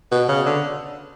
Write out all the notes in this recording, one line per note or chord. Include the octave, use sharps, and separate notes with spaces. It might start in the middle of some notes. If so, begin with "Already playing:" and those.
B2
C#3
D3